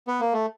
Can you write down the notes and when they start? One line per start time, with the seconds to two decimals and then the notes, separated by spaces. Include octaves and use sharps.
0.08 B3
0.20 A#3
0.33 A3